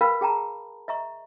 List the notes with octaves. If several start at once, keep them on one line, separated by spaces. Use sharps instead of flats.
A#4 B4 F5 G5 B5
G#4 G5 A5 A#5
D#5 E5 A#5 C#6